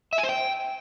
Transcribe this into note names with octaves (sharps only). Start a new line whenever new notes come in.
E5
G#5
C5
G5